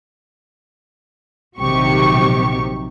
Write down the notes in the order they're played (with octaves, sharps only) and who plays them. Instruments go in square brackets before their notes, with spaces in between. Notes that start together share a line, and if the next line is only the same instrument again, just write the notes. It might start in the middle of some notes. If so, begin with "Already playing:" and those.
[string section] A#1 C3 D#3 F#3 G4 C#6